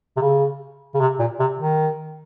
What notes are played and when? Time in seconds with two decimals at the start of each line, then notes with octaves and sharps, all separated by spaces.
0.17 C3
0.21 C#3
0.94 C#3
1.00 C3
1.19 A#2
1.40 C3
1.58 D#3